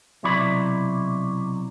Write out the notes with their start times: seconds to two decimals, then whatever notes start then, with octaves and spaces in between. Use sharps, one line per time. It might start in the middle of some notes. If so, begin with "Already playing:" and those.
0.23 B1 C3 F#3 E4 D5 B5